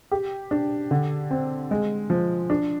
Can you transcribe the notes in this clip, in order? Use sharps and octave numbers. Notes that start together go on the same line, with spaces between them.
G4
D4
D3
C4
G#3
F3
D4